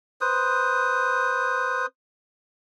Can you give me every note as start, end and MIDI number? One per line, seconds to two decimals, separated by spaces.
0.21 1.86 71
0.21 1.86 72
0.21 1.86 87